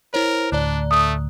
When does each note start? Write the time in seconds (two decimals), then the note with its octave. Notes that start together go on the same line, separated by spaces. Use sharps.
0.14 E4 A#4 C5 C#5
0.52 D2 A2 D4 D5 A#5 F#6
0.91 A3 D#6